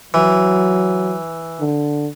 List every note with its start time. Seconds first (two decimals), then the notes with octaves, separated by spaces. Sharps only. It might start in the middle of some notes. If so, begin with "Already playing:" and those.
0.14 E3 F#3
1.60 D3